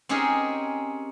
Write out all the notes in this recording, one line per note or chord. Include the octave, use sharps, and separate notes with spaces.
C4 C#4 D#4 G4 G#4 A#4